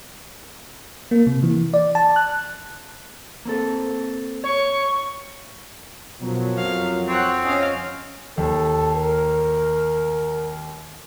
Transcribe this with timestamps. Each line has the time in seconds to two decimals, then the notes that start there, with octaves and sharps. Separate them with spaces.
1.11 A#3
1.27 C3
1.43 E3
1.74 D5
1.95 A5
2.16 F#6
3.45 A#3 C4 A4
4.44 C#5 C#6
6.21 F#2 B2 F3 F#3
6.57 F2 F5
7.08 C4 C#5 F#5
7.44 C#4 D#5 F5
8.37 D#2 A4
8.96 A#4